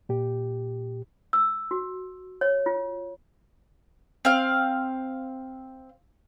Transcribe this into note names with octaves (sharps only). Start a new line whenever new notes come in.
A#2 G4
E6
F#4
C#5
F4
C4 F5